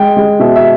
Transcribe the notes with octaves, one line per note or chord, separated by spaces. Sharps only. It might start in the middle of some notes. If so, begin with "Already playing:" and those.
Already playing: G#3 G5
G#3
B2 E5
E5